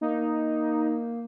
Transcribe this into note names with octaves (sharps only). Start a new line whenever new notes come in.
A#3 D#4